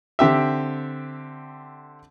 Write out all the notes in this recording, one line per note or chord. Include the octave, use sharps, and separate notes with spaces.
D3 C4 G4 E5